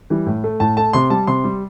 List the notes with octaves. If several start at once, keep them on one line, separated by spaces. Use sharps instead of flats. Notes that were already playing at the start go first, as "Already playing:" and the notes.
E3 G3
A2
A3
A2 A5
A3 A5
C3 C6
G3 A5
C3 C6
G3